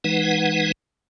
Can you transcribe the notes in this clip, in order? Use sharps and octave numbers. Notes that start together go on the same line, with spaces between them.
E3 G#3 D#4 B4 F#5